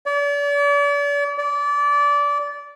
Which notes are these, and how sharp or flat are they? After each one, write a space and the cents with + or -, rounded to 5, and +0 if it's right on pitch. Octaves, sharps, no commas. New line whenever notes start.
D5 -40
D5 -25